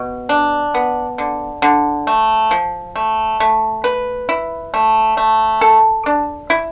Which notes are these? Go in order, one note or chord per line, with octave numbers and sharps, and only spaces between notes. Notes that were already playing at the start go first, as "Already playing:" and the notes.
Already playing: B2
D4
B3
D3
D3
A3
F3
A3
A3
B4
E4
A3
A3
A4
D4
E4